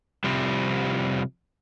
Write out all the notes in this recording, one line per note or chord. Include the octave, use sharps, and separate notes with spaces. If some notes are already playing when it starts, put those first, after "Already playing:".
C3 F3 G3